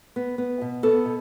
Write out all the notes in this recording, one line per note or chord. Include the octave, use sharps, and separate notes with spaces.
B3
B3
B2
B3 A4
B2